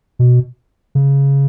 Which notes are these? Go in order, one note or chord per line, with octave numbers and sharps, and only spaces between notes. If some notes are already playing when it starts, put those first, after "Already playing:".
B2
C#3